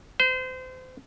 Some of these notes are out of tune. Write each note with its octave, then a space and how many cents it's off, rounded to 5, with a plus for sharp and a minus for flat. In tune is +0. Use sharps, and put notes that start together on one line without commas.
C5 -30